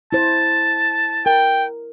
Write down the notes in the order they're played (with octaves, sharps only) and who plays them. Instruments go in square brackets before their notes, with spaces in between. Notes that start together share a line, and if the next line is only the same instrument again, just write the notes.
[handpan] E4 C5 [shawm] A5
[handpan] A#4 [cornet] G5